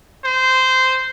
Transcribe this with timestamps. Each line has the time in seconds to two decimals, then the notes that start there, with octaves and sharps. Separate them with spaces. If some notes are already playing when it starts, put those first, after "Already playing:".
0.24 C5